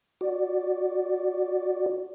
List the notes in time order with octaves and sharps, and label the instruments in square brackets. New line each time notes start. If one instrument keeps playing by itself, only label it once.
[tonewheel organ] F#4 D5